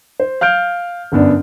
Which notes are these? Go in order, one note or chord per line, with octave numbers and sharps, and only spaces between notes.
C5
F5 F6 G6 D7
G1 F#2 B3 D4